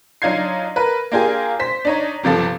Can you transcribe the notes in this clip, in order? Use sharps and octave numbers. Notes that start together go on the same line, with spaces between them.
F#3 D4 D#4 F4 G#6 C7
A#4 B4
A#3 D4 F4 G4 G#4 G#5
C5 B6
D4 D#4 C#5
G1 C3 F3 A4